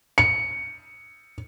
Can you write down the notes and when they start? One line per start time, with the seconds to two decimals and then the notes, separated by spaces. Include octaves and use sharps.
0.18 C#7